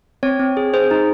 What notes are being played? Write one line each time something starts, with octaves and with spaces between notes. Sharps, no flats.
C4 C#5
C4
G#4
G#4 C5
D#4